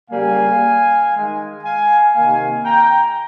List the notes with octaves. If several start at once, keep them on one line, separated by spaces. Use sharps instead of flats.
C#3 G3 A#3 F5 G#5
D#3
G#3
F5 G#5
C3 D#3 A#3 F5 G#5
G5 A#5